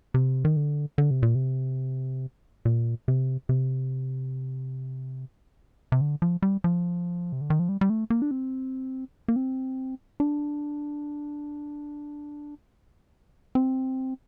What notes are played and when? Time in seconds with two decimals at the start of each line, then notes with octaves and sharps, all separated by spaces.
0.14 C3
0.45 D#3
0.56 D3
0.98 D3
1.11 C3
1.23 A#2
1.35 C3
2.65 A#2
3.08 C3
3.49 C3
5.92 C3
6.01 D3
6.22 F3
6.42 G3
6.64 F3
7.32 C3
7.41 D3
7.50 D#3
7.59 F3
7.69 G3
7.81 G3
7.90 A3
8.10 A#3
8.22 D4
8.31 C4
9.28 A#3
9.36 C4
10.20 D4
13.55 C4